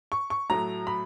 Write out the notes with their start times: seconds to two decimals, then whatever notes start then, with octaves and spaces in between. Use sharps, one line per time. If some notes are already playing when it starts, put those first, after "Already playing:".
0.12 C#6
0.30 C#6
0.49 A2 F#3 A3 A#5
0.87 B5